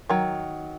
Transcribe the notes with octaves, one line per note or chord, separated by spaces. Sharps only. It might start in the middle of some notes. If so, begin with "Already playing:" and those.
D#3 F#3